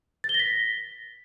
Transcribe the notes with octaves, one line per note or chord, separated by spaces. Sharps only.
A6
G7
A#6
B6